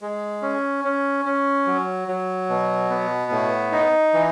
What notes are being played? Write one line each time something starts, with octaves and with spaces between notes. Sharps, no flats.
G#3
C#4
C#4
C#4
F#3
F#3
B2
B3
A2
D#4
E3